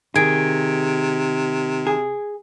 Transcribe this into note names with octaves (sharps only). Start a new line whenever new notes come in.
C3 D#3 G#4 G#6 D7
G#4